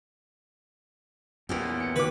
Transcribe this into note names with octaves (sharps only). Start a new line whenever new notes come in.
E2 A#2 B3 C#4 G4
C#7
D#2 F#4 B4 D6